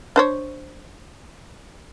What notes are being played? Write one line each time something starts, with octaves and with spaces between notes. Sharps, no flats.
D4 C5 C#5